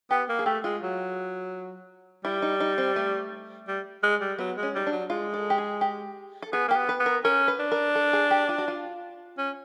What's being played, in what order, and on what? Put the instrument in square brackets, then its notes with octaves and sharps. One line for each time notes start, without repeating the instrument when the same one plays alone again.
[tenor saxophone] B3 [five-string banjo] G4
[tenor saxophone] A#3
[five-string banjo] G#4
[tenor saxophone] A3 [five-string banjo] G4
[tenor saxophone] G#3 [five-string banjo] F4
[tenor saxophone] F#3
[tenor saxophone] G3 [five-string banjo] E4
[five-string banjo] D#4
D#4
C4
A3
[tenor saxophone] G3
G#3
G3
[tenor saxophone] F#3 [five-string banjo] B3
[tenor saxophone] G#3
[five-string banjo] C#4
[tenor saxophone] G3 [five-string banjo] D#4
[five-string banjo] D4
[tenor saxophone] F#3
[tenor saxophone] G#3 [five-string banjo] F4
[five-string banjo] A4
G4
G#4
G4
A4
[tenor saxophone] B3 [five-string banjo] G#4
[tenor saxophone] A#3 [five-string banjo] G4
[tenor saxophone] B3
[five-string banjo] B4
[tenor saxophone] B3
[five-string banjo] A#4
[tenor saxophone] C#4 [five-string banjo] A#4
[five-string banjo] B4
[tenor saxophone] D4
[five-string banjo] A#4
A4
G#4
G4
F4
F#4
F4
[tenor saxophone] C#4